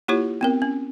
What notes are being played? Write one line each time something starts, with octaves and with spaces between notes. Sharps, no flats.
A#3 E4 F4 G4 C#5
B3 C4 A#4
C#4